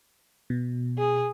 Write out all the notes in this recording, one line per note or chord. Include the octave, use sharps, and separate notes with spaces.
B2
G#4